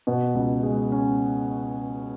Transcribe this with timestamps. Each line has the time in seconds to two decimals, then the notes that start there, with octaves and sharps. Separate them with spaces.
0.07 B2
0.35 C#2
0.63 G#3
0.92 C#4